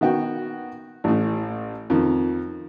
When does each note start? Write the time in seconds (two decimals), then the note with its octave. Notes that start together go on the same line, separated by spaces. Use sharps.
0.01 D#3 B3 F#4 G5
1.04 A1 A2
1.90 F2 D#3